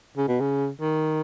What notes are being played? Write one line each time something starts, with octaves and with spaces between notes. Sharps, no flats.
C#3
B2
C#3
D#3